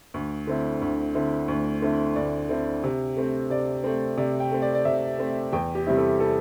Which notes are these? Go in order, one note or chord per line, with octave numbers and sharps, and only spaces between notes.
D2
D3 C4 E4
D2
D3 C4 E4
D2
D3 C4 E4
D2 D5
D3 C4 E4
C3
A3 C4
C3 D5
A3 C4
C3 D5
G5
A3 C4
D5
D5
C3 E5
A3 C4
E2 G5
G4
C3 G3 C4 E4
A4
A4